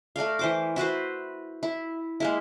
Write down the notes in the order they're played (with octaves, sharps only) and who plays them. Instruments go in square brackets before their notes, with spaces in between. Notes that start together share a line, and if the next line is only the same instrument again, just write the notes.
[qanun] A3 A#4 D5 F5
E3 C5 D6
E4 F#4 B4 C5
E4
G#3 A#3 E4